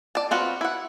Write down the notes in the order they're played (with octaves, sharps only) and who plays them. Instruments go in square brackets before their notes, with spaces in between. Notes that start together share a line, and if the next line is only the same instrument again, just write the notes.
[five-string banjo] D5 A5
C4 F4 F#4 B4
E4 F#5